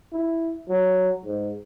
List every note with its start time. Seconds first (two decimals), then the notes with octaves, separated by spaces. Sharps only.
0.13 E4
0.69 F#3
1.25 G#2